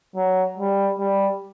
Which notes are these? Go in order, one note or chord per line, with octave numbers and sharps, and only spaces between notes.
F#3
G3
G3